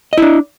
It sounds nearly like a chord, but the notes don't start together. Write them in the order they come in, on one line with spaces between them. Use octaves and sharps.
D#5 E4 D4